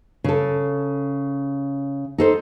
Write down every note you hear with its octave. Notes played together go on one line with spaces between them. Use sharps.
C#3 A4
D#4 A4 C5